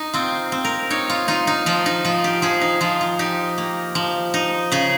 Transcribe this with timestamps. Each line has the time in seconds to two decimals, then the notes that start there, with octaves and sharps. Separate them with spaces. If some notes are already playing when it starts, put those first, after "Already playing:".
Already playing: D#4
0.13 C4 F4
0.52 C4
0.64 A#4
0.90 D#4 C#5
1.09 F4
1.28 D#4 F4
1.47 D#4
1.66 F3 F4
1.86 D#4
2.04 F3 F4
2.24 G4
2.42 F3 G#4
2.61 D#4
2.81 F3 F4
3.01 F4
3.19 D#4 G4
3.58 A#3
3.95 F3
4.34 D#4
4.72 C#3 G#4